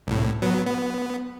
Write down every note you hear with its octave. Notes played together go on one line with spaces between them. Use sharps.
C2 A2
F#3 B3
B3